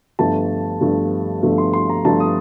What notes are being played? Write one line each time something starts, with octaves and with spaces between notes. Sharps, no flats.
G1 G2 F3 A3 A5
G1 G2 F3 A3
G1 G2 F3 A3
C6
C6
A#5
G1 G2 F3 A3 A5
D#6